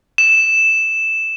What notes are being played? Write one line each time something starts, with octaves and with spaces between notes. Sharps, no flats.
E7